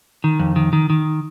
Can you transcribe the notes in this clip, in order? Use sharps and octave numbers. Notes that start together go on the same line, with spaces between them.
D#3
F2
D#3
D#3
D#3